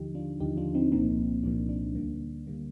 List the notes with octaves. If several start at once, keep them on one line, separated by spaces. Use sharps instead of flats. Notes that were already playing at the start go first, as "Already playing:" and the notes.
Already playing: D#2 D3 F3 D#4 G4
D4 F4
D#2 D3 F3 D#4 G4
D4 F4
C4 D#4
C2 A#2 F3 A#3 C4 D#4
C2 A#2 F3 A#3 D4
D4
D2 D3 G3 A#3
D3 G3 A#3